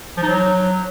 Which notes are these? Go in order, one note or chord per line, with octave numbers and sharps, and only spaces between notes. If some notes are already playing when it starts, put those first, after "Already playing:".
F3
D#4
F#3